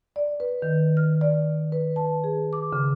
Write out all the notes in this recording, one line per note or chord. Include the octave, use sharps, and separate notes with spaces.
D5
B4
D#3
F6
D5
B4
A5
G#4
D6
C#3